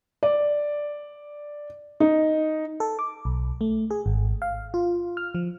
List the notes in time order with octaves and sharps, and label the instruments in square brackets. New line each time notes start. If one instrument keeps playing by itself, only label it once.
[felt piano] D5
D#4
[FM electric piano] A4
D6
B1
A3
G#4
G#1
F5
F4
F6
F3